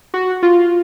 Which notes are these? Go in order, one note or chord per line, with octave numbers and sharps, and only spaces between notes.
F#4
F4